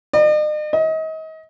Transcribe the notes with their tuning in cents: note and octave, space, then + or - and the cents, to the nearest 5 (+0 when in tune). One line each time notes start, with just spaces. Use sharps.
D#5 -45
D#5 +35